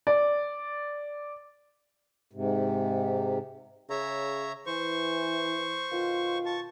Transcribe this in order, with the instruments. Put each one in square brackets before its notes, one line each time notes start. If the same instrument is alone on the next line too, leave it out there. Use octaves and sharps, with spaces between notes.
[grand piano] D5
[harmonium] G#2 C3
[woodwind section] C#3 [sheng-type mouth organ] C#5 E5 A#5
[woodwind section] E3 [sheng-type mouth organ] C5 C#6
[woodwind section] B2 D#3 F4
[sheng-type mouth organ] A5 C#6